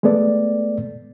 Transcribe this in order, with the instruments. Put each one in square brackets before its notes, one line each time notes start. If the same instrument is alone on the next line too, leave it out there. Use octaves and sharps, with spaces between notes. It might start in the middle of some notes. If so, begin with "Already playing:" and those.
[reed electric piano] G#3 A3 B3 A4 D5